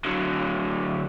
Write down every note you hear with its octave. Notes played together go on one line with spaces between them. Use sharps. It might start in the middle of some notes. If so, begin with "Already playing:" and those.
D3 F#3